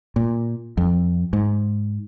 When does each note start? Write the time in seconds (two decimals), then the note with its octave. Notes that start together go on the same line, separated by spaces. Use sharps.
0.16 A#2
0.77 F2
1.33 G#2